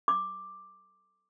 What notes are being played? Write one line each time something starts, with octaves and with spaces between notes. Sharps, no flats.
D6